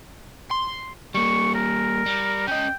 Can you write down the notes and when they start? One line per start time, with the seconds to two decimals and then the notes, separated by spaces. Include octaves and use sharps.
0.51 C6
1.15 G3 A#3 C#6
1.55 A#4
2.06 G3
2.47 C#4 D#5 G5